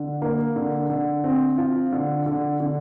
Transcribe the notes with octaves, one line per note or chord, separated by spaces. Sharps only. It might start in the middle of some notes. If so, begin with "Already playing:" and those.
Already playing: D3
A#3
D3
D3
C4
F4
D3
D3
D3